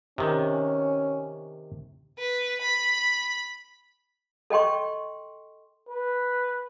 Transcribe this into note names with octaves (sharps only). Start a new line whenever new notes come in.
C3 D#3 C#4
B4
B5
A4 D#5 G5 C6 C#6
B4